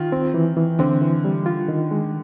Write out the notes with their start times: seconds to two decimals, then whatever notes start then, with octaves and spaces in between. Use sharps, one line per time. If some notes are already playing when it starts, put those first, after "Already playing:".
Already playing: D#3 F4
0.12 C4
0.34 E3
0.57 E3
0.79 D3 C4
1.02 E3
1.25 G3
1.46 F4
1.68 D#3
1.91 G#3